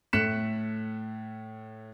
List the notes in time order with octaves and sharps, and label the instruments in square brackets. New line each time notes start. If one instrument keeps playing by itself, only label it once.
[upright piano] A2 A3 F#6 B6 C#7 E7